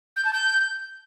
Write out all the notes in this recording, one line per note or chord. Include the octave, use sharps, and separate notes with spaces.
G6
A5
G6